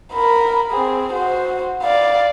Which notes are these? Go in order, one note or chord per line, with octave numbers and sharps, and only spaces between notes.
A#4 B5
C4 G#4
F#4 C5
D5 F5